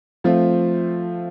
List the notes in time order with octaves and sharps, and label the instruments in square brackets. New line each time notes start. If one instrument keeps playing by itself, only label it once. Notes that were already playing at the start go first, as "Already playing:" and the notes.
[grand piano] F3 A3 C4 F4